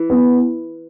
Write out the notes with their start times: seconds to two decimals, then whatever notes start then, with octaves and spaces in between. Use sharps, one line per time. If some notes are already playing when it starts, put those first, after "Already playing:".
Already playing: E3
0.10 B3